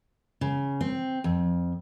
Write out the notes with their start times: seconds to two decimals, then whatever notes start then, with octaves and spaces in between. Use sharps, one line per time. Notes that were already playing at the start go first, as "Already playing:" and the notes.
0.41 C#3
0.81 C4
1.24 F2